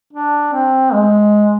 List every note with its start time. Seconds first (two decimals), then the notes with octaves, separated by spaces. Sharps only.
0.13 D4
0.53 C4
0.93 G#3